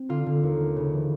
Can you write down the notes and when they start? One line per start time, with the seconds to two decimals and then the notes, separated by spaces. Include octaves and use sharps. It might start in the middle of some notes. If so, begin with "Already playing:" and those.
Already playing: C4
0.09 D3 F4
0.26 D3
0.43 D#2
0.60 A3
0.76 C#3
0.93 E3